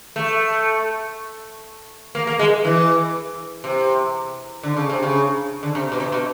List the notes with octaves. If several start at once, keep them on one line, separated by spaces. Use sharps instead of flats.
A3
A#3
A#3
G#3
E3
C3
D3
C#3
C3
C#3
D3
C3
B2
C3
B2